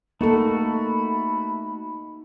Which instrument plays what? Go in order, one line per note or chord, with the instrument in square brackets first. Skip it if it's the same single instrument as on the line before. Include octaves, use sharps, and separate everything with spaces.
[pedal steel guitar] A3 F#4 [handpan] A#3 A4 [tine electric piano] D#4 [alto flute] B5